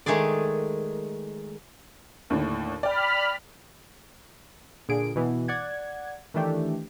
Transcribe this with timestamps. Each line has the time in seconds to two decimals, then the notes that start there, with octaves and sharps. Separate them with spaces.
0.06 D#3 G#3 A3 G#4 D5
2.30 D#2 A2 D3
2.83 D5 G5 B5 F6
4.89 A#2 D3 G#4 D7
5.16 B2 E3 B3
5.48 D5 F#5 G#6
6.34 D#3 E3 A3 D4 G4